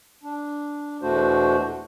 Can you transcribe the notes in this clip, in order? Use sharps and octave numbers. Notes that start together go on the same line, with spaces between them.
D4
E2 B2 A3 D4 F#4 C5